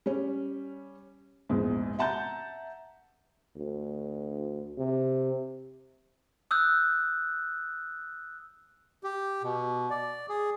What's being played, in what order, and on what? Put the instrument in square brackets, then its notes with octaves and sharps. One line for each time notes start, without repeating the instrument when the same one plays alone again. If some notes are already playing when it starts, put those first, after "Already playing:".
[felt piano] G3 C#4
A#1 E2 G#2
E5 F#5 A5 A#5 G6
[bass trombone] D2
C3
[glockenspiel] D#6 E6 F#6 G6
[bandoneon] G4
B2
D5
G#4